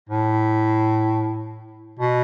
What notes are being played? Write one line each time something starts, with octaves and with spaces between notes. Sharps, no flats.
A2
B2